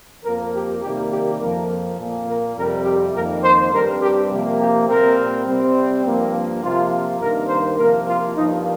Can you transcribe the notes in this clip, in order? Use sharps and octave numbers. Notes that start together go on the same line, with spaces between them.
F2 F3 A#3 A#4
G4
C3 D#3 G3 A#3 G4
G4
F2 F3 A#3 A#4
A#2 A#3
A#4
F2 C3 G3 A#4
G4
F2 D#3 A#3 A#4
C5
G2 G3 C4 A#4
G4
C3 F3 A#3
G4
A#2 G3 C4 A#4
C3 G3 C4
G2 F3 A#3
C3 F3 A#3 F4
G2 D#3 A#3 A#4
C5
C3 F3 A#3 A#4
F4
G2 F3 A#3 D#4